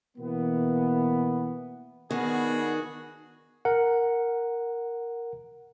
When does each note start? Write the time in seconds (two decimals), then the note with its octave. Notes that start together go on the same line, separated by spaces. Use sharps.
0.18 B2 E3 A#3 B3
2.11 D#3 B3 D4 F#4 G#4
3.65 A#4 F#5